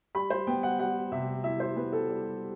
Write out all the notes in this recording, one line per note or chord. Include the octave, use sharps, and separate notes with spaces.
G3 B5
C5
B3 G5
F#5
G3 F#5
C3 E5
E4 E5
C5
B3 B4
A4
G3